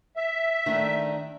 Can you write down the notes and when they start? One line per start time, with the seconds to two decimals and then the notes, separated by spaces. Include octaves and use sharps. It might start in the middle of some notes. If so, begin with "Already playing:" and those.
0.16 E5
0.66 D#3 A3 D4